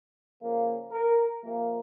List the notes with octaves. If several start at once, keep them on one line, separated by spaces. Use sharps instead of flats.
C#3 F3 A#3
A#4
C3 F3 A#3